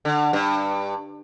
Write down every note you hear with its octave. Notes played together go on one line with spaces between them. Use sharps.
D3
G2